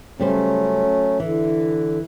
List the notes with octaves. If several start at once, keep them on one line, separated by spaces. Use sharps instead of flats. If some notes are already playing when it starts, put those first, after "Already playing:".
C#3 F#3 G3 A3 C#4 C5
D3 E3